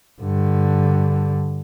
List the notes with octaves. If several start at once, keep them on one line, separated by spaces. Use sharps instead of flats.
G2 D3